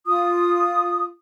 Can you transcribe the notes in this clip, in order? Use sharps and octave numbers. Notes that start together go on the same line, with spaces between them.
F4 D#6